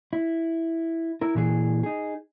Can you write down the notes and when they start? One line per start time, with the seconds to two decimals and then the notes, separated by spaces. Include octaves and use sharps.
0.13 E4
1.21 E4 A#4
1.35 A#2 E3 G#4
1.83 D#4 G#4